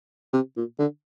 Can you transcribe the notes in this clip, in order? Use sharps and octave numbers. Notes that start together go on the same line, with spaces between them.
C3
A#2
D3